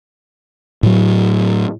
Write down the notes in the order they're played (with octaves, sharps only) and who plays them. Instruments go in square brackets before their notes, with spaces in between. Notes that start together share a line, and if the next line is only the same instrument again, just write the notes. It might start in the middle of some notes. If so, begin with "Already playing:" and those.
[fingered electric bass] A2 F#3